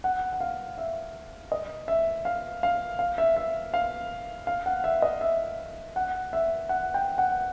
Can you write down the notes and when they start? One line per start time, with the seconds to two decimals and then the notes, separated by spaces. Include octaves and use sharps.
0.04 F#5
0.33 F#5
0.41 F5
0.78 E5
1.52 D#5
1.88 E5
2.25 F5
2.63 F5
2.99 F5
3.18 E5
3.37 E5
3.74 F5
4.47 F5
4.66 F#5
4.84 E5
5.02 D#5
5.21 E5
5.96 F#5
6.33 E5
6.69 F#5
6.94 G5
7.18 F#5